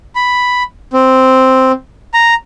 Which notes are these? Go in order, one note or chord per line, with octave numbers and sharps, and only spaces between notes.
B5
C4
A#5